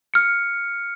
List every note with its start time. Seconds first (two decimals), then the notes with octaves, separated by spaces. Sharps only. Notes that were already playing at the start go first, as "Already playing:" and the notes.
0.14 F6 C#7